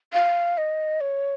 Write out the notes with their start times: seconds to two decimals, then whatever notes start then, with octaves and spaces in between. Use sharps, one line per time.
0.13 F5
0.58 D#5
1.01 C#5